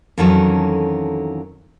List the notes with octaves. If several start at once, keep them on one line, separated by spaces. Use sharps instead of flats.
F2 D#3 E3 F#3 C#4 A4